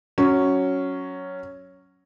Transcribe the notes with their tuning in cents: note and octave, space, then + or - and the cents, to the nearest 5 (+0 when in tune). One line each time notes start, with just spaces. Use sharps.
F#3 +0 C#4 +0